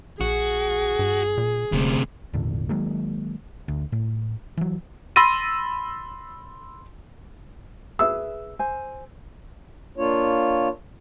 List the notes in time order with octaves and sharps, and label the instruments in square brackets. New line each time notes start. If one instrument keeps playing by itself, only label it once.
[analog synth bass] A#1 [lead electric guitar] F#4 [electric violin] G#4
[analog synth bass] G2
A#2
[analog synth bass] D#1 [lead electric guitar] D2 C3
[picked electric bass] G#1 E2 A#2 D3
D#3 F#3 G#3 A#3
D2
A2
E3 F#3
[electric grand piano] B5 C6 E6 A6 A#6 D#7
[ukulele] G#4 B4 E5 [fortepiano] E6
[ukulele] C5 G#5
[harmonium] A#3 D4 F4 C#5